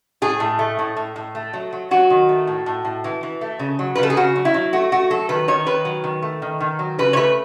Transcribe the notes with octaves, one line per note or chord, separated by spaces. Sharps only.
A2 G#4
A2
A3
A2
A2
A2
A3
F#3
F#3
F#3 F#4
D#3
A3
A2
A2
A2
E3
E3
A3
C#3
F#3
B4
C#3 A4
G#4
C#3 F#4
F#3
E4
F#3
A3 F#4
A3 F#4
F#3 A4
D#3 B4
D#3 C#5
D#3 B4
F#3
D#3
A3
D#3
D#3
F#3
C#3 B4
C#5
A3 B4